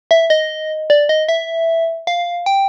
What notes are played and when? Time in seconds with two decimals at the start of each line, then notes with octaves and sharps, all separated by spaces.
0.11 E5
0.30 D#5
0.90 D5
1.09 D#5
1.29 E5
2.07 F5
2.46 G5